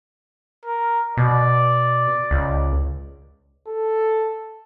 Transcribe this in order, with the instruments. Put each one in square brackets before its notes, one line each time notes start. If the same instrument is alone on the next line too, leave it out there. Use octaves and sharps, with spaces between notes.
[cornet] A#4
[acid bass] B2 [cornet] D5
[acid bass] C#2
[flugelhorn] A4